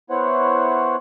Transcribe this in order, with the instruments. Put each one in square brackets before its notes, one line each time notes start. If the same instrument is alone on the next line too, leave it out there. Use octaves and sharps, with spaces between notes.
[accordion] B3 E4 C5 C#5 F#5